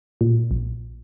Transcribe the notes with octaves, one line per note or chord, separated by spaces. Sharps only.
A#2
A#1